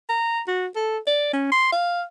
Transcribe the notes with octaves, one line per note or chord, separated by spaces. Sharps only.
A#5
F#4
A4
D5
C#4
C6
F5